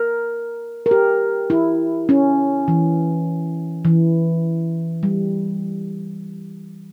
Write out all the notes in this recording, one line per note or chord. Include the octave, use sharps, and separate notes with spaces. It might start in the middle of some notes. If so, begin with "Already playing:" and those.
Already playing: A#4
A#4
G4
E4
C#4
E3
E3
G3